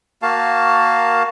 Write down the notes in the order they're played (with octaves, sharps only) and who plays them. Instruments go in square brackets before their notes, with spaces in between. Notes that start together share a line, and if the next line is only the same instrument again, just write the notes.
[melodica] A#3 F#4 F5 A5